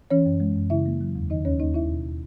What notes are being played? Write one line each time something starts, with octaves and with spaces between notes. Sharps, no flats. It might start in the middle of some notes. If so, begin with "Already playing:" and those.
E3 C#4 C#5
F#2
G#3
F#2
C#3 E4 E5
A#3
F#3
E2
D#3 D#4 D#5
D#2 C#4 C#5
A#3 D#4 D#5
D#2 E4 E5
B2